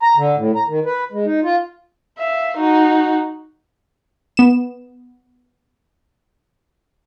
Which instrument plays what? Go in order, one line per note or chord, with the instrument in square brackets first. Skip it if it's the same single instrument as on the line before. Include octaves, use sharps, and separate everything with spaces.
[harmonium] A#5
D3
A2
A#5
D#3
B4
G#3
D#4
F4
[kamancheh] E5 F5
D#4 F#4
[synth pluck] B3 E7